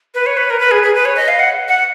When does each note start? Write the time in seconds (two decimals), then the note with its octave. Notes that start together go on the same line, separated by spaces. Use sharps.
0.14 B4
0.26 C#5
0.37 B4
0.50 A#4
0.60 B4
0.71 G#4
0.83 G#4
0.95 B4
1.05 C#5
1.16 D#5
1.28 F5
1.39 F#5
1.68 F#5